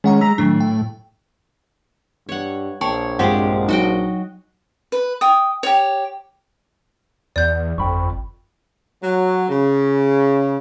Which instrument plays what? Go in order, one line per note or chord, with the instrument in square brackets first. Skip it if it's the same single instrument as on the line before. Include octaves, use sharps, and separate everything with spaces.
[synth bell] D#3 F#5 A#5 [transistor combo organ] G#3 C#4
[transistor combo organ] G#3 A#5 [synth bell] E6 B6
[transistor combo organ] A2 [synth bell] D#3 F#3 D4
[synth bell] G5
[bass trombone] G2 [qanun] C#5 F#5
[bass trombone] A#1 [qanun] C#5 [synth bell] G5 A5 C#6
[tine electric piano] G2 C4 F4 [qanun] G#3 G4 [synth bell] F#5 G5
[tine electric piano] F#3 [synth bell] D#4 [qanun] F#4 D#5 G5
[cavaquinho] B4
G5 D#6
G4 C#5
[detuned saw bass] E2 [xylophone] D5 G6
[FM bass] G1 [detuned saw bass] F2 [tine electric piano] G5 B5 C#6
[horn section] F#3
C#3